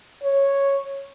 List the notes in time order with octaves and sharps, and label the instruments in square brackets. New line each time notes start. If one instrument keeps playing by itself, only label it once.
[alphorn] C#5